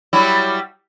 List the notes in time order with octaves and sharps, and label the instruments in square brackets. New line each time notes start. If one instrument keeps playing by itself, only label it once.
[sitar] F#3 G3 E4